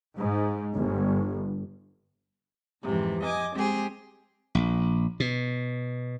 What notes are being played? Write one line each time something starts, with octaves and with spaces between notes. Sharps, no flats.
G#2
G1
F2 G#2 C3 E3
D#5 G#5 D6
G#3 C4 G4 G#4
A#1
B2